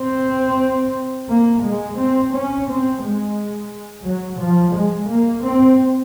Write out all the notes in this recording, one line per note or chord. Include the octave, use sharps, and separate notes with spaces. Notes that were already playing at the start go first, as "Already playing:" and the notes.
Already playing: C4
A#3
G#3
C4
C#4
C4
G#3
F#3
F3
G#3
A#3
C4